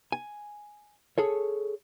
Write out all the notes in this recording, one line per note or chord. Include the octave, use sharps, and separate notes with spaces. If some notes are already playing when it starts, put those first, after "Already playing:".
G#5
G#4 A4 C#5